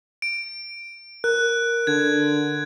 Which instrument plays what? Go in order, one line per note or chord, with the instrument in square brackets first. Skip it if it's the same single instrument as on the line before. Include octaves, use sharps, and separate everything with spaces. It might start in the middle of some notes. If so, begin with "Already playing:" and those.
[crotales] D7
[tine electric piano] A#4 [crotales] F#6
[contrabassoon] D3 [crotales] G#6